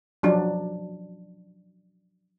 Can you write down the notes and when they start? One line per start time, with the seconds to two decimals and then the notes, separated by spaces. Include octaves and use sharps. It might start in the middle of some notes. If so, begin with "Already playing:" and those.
0.23 F3 F#3 D4